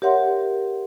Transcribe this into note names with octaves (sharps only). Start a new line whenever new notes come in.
G4 A#4 C#5 E5 F#5 C6